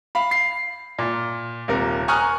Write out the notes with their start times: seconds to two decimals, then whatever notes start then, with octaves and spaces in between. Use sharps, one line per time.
0.15 F5 B5
0.31 C7
0.99 A#2
1.68 D#1 C3 A#4
2.08 G#5 A#5 C#6 D#6 F6 F#6